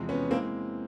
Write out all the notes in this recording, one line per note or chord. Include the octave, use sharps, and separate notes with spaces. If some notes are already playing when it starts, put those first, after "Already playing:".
Already playing: E2 C3 F3 G#3
B3 C#4
E3 G#3 A#3 C4